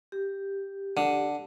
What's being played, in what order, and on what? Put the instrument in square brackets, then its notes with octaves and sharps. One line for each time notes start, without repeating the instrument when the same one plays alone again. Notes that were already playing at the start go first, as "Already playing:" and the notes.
[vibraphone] G4
[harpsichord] D3